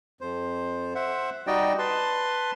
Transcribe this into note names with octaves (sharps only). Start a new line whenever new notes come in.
F2 C5
C5 E5 F#5
G3 D#4 F#4 D5 D#5 G5
B4 A5 C6